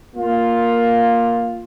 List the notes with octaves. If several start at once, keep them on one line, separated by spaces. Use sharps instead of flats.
A#3 F4